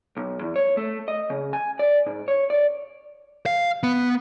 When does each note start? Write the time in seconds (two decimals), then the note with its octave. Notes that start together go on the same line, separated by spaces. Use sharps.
0.17 B1
0.41 E2
0.56 C#5
0.77 A3
1.08 D#5
1.30 C#3
1.53 G#5
1.79 D5
2.06 G#2
2.28 C#5
2.50 D5
3.46 F5
3.83 B3